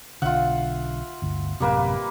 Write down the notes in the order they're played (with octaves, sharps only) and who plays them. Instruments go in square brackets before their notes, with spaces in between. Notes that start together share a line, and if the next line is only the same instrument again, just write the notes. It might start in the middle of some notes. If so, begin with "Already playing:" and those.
[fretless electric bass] B1 D3 [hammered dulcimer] F4 E5 F#5
[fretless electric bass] G1 D2
[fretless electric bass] A1 F#2 C3 [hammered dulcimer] G3 A#3 B4